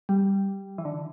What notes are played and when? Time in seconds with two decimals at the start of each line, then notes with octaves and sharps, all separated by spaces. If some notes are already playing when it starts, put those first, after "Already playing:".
0.09 G3
0.78 E3
0.85 D3